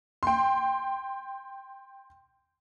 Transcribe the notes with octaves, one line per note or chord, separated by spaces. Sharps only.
G5 C6